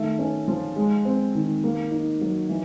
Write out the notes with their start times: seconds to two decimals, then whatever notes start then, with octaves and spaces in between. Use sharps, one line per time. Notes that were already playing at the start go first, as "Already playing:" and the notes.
Already playing: D#3 A3
0.19 C#4
0.48 F3
0.76 G#3
1.05 C4
1.35 D#3
1.64 A#3
1.92 D#4
2.21 F#3
2.49 E3